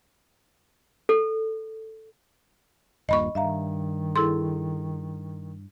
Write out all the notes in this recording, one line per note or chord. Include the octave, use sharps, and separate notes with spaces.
A4
D#1 G2 A#2 D#5 B5 C#6
G2 D#3 E5 F5 A#5
E4 G#4 A4 C6